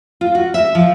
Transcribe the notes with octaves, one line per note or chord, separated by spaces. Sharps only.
F4
F#4
E5
F3